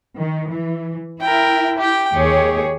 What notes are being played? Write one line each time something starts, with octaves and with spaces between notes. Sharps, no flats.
D#3
E3
E4 A#4 G5
G4 G5
D#2 G4 G#4 C#5